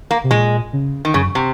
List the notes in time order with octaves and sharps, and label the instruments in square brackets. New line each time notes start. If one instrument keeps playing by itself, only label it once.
[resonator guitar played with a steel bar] A#3
[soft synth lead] C3
[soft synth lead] A#2 [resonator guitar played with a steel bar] G#3
[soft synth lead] C#3
[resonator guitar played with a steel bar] D#3
[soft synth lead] F#2 [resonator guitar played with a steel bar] C#3
[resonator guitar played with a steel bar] C3